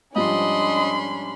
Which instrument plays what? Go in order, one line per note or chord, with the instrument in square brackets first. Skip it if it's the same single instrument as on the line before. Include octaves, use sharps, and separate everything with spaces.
[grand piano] G#2 F3 G3 [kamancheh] C#4 D4 [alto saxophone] D#5 [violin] B5 C6